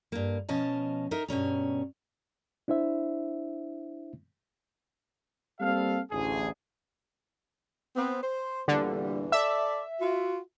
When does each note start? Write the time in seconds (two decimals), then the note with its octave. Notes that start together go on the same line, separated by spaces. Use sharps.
0.12 G2 A#3
0.49 B2 F3 C#4 D#5 F5 A5
1.11 D#4 A#4 E5
1.28 G2 B2 C#4 A#5
2.68 D4 E4 C5 E5
5.60 G3 A#3 C4 A4 F5
6.11 A1 D2 G#4
7.95 B3 C4
8.22 C5
8.68 E2 A#2 D3 G3
9.32 A4 D5 E5
10.00 F4 F#4